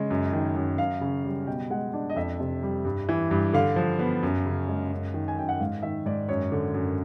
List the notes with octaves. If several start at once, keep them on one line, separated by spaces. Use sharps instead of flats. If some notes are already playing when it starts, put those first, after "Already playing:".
Already playing: C#3 G#3
F#2
D#3
F#2
F#2 F5
C#3
G3
B2 G5
G#3 F#5
D4
D#5
F2 E5
C3
G3
G2
E3
G2
D3 F5
F3
B3
F#2
C#3
G#3
F#2
D#3
G#5
F#2 G5
F#5
G#2 F5
D#3 E5
G#2 D5
F#2 C#5
D3
F#2